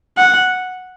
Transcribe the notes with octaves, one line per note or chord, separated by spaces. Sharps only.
F#5